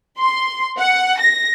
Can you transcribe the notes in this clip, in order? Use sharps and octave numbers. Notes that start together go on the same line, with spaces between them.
C6
F#5
A#6